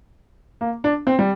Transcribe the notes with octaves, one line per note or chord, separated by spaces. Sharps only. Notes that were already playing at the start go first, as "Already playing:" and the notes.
A#3
D4
C4
G3